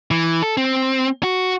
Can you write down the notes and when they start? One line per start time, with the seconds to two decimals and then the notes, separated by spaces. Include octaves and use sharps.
0.11 E3
0.43 A4
0.57 C4
1.23 F#4